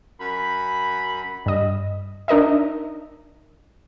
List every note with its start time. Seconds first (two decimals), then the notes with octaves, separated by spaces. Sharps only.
0.21 F#2 B5
1.46 G2 D#5
2.28 D4 D#4 A#4 D#5 E5